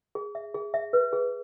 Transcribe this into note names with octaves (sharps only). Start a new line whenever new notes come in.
G#4
E5
G#4
E5
B4
G#4